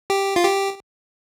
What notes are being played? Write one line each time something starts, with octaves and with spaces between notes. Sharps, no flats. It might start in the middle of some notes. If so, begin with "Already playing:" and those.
G4
F4
G4